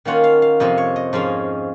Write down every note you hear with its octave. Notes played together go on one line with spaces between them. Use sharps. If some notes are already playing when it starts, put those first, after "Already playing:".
D#3 A#3 C#4 F4 F#5
F5
F5
F2 C3 F3 C4 D#5
C#5
D#5
G#2 F3 G#3 C#4 F5